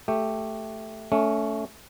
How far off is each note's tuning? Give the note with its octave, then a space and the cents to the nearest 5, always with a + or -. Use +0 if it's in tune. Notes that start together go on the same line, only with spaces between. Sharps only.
A3 +0 G4 +0
A3 +0 C#4 +25